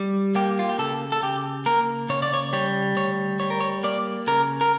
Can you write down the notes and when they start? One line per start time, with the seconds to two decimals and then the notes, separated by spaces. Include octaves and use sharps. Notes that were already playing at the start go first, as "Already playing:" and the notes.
Already playing: G3
0.35 A#3 G4
0.59 F4
0.69 G4
0.78 C#3 A4
1.12 A4
1.22 C#3 G4
1.66 A#3 A#4
2.09 C#3 C#5
2.22 D5
2.34 C#5
2.53 G3 C#5
2.96 D2 C#5
3.40 G3 C#5
3.50 A#4
3.61 C#5
3.83 A#3 D5
4.27 C#3 A#4
4.61 A#4